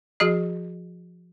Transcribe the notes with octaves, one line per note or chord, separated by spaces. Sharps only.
F3 F#4 G#4 D#5